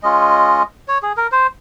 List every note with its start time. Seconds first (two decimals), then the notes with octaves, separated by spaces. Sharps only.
0.03 G#3 C#4 F4 D#5
0.88 C#5
1.02 G#4
1.17 A#4
1.32 C5